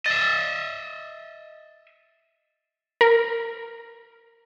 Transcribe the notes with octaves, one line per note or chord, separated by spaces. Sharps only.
D#5 E5 A6
A#4